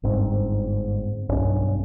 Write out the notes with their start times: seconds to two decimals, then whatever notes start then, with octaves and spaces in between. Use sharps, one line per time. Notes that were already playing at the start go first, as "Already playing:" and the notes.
0.03 G1 G#2 C4
1.29 B1 G2 C#4